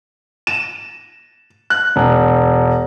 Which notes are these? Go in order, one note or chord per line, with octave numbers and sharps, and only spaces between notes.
E7
F#6
E1